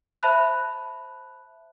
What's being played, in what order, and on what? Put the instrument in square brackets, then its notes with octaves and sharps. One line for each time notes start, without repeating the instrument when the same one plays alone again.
[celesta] C5 E5 A5 B5 F#6